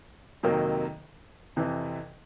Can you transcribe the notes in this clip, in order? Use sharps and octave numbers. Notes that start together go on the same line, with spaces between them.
F2 C3 D#3 F#3 A#3
F2 C3 E3